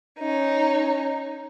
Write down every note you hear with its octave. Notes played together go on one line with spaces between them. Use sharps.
C#4 D#4